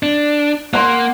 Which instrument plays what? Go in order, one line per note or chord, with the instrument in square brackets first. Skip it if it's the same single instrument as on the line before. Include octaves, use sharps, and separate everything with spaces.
[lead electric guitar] D4
[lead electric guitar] A#3 [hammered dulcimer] F#5 C6